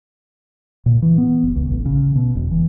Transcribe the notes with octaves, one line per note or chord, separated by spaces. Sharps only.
A#2
E3
B3
F#1
C#2
A1
C#3
B2
E1
E3